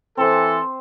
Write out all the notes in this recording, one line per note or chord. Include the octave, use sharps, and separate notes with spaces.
E3 C4 A4 C5